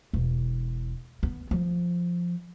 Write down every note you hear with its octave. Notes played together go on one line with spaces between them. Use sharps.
E1
B3
F3